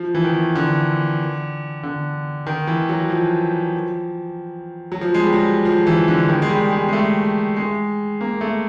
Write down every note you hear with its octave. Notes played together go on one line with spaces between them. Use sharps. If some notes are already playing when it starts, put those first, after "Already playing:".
Already playing: F3
E3
D#3
D3
D3
D#3
E3
F#3
F3
F#3
F3
G#3
G3
F#3
F3
E3
D3
D#3
G#3
G3
G#3
G#3
A3
G#3
A#3
A3